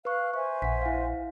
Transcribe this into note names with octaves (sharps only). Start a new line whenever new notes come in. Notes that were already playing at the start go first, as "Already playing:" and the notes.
B4 F5 C#6 F#6
C5 E5 G#5 C#6
A#1 F#5 B6
E4 F5